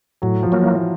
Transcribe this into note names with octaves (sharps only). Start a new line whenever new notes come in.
A2 F#3
F3
F#3 A#3
E3